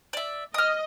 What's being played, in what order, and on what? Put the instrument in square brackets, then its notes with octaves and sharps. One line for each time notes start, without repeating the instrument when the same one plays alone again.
[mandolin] D5 E5
[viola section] D#5 [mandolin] D#6 F6